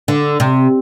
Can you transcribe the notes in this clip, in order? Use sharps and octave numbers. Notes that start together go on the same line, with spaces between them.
D3
C3